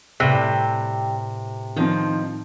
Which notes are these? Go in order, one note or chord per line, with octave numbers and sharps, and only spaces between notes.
A2 C3 G3 B4 G5 A5 F#6
D2 G2 D#3 F3 C4 D#4